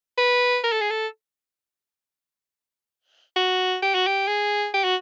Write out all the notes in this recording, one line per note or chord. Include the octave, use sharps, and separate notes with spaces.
B4
A#4
A4
G#4
A4
F#4
G4
F#4
G4
G#4
G4
F#4